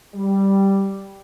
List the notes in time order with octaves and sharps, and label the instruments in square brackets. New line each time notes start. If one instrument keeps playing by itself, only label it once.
[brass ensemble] G3